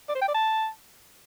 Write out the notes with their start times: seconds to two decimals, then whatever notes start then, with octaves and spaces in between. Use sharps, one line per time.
0.09 D5
0.15 C5
0.22 G5
0.28 D5
0.34 A5